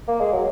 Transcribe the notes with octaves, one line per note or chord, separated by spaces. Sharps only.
A#3
G#3
F#3